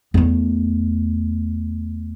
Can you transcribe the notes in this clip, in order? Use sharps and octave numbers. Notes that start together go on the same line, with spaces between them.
E2 A3